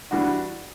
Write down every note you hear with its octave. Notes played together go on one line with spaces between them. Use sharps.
E3 G3 D4 F#4